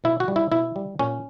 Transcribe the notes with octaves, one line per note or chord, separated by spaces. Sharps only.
B2 E4
F#4
G3
E4
B2 E4
G3
A#2 C#4